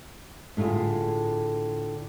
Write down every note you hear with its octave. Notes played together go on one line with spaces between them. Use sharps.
A2 D3 A3 F4 G#4